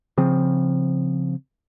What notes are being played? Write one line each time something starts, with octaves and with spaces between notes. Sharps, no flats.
C#3 F3 C4